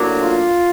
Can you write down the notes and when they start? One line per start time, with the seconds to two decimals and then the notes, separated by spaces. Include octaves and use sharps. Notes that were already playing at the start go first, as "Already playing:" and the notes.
Already playing: A2 F#3 A#3 D4
0.19 F4